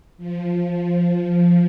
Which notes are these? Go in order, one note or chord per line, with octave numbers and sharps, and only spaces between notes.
F3
F3